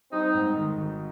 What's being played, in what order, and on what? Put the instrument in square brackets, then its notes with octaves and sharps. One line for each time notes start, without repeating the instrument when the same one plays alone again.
[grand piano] G3 [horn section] C4 D#4
[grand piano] G#2
D#3
G#1